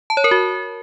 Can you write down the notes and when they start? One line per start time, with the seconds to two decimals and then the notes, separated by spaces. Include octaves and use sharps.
0.10 A5
0.17 C#5
0.24 A#4
0.31 F#4